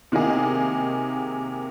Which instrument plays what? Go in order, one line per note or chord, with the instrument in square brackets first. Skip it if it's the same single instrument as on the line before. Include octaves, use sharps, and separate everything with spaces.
[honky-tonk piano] C3 D#3 A#3 D#4 G#4